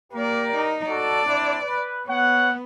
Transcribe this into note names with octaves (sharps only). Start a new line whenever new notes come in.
A#3 G4 A#4 D5
D#4
F#4 A4 D5
C4 D4 E4
B4
B3 C#5 F#5